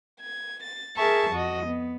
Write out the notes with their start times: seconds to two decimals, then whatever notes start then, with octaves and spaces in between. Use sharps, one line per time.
0.21 G#6
0.63 A6
0.97 G#4 A#4 E5 A5 C#6
1.31 F2 F#4 D#5
1.67 B3